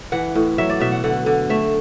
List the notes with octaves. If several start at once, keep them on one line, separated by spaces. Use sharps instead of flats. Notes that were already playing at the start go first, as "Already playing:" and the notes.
E3 F#5
A2
F#3 E5
D5
B2 E5
F#5
D3 F#5
D3
A3 E5